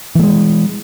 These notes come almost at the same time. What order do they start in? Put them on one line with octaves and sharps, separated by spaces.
E3 A3 G#3